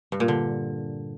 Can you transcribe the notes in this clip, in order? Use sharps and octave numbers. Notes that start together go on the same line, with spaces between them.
G2
A#2
D3